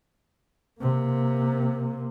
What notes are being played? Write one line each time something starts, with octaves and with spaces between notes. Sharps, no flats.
C3 A#3